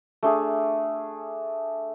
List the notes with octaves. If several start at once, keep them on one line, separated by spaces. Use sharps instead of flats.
A3 D4 G#4